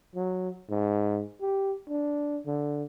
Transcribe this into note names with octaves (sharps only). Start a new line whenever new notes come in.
F#3
G#2
G4
D4
D3